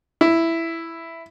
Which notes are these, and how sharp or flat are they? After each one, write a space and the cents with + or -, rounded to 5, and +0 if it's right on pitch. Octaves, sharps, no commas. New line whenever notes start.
E4 +5